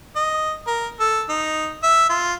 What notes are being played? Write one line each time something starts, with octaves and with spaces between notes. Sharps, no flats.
D#5
A#4
A4
D#4
E5
F4